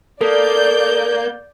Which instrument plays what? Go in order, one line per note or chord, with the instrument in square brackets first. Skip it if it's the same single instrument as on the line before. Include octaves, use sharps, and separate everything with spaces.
[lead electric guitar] A#3 [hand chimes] A4 [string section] D5 G6